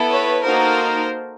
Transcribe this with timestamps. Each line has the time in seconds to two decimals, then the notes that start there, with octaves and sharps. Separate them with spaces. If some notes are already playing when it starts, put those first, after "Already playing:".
Already playing: B3 E4 A4
0.08 B4 C#5
0.43 A#3 D#4 F#4 A4 A#4 C5